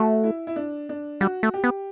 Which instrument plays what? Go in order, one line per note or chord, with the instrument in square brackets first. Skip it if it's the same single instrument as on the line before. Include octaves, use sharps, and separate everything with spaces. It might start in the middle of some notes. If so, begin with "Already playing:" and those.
Already playing: [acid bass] A3 [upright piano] F#4
[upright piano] E4
E4
D4
D4
[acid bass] G3 [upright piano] F#4
[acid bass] A3
[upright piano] G4
[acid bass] B3